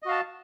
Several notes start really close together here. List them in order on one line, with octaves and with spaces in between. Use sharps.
D#5 F#4 F5 A5